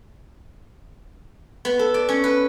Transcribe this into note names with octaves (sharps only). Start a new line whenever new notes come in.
B3
A4
D5
C#4
B4